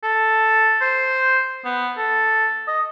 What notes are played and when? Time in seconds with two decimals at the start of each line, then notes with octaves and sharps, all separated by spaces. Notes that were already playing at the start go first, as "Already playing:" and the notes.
0.03 A4
0.81 C5
1.65 B3
1.97 A4
2.68 D#5